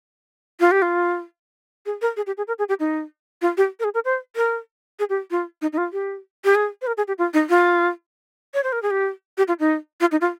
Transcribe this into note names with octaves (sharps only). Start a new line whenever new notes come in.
F4
G4
F4
G#4
A#4
G#4
G4
G#4
A#4
G#4
G4
D#4
F4
G4
A#4
G#4
A#4
C5
A#4
G#4
G4
F4
D#4
D#4
F4
G4
G4
G#4
C5
A#4
G#4
G4
F4
D#4
F4
C#5
C5
A#4
G#4
G4
G4
F4
D#4
F4
D#4
F4